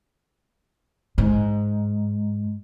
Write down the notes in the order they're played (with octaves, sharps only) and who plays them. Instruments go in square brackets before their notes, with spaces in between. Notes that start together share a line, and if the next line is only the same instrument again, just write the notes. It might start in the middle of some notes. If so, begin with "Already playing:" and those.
[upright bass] G#2